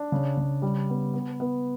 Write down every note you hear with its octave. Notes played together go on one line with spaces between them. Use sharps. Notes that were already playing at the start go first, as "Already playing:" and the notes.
Already playing: D4
C#3
C#3
G3
B3
B3
B3